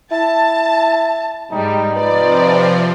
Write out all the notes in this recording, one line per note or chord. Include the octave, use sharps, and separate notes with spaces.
E4 A5
G#2 G3 D#4
C3 F3 B4 D5